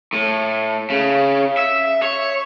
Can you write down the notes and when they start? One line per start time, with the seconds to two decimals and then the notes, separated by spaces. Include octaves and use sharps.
0.13 A2
0.90 C#3
1.57 E5
2.02 C#5